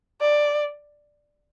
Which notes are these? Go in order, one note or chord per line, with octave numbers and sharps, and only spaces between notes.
D5